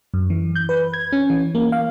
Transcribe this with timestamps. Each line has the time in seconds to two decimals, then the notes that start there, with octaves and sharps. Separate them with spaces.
0.14 F#2
0.30 E3
0.55 G6
0.69 B4
0.94 G#6
1.12 C#4
1.30 E3
1.55 A#3
1.72 F5